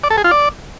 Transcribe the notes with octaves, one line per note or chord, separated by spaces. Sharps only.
D5
A4
G#4
F4
D5